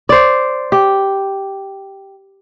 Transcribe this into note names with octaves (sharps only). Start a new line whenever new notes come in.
C5 D5
G4